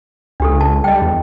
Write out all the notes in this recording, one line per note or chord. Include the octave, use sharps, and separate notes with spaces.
C#2 D4 G4 A4
A5
G3 D#5 G5
E2